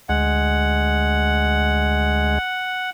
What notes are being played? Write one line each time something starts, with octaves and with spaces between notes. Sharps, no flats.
D2 G#3 F#5